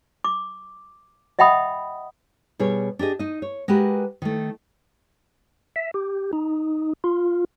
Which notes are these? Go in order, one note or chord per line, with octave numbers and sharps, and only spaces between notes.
D6
D#5 E5 F#5 G5 B5 D#6
B2 G3 G#4 C#5
D4 G4 G#4 D#5
D#4 D#5
C#5
G#3 F#4 G4 A#4 B4
D#3 A3
E5
G4
D#4
F4